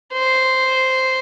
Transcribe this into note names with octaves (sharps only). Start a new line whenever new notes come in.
C5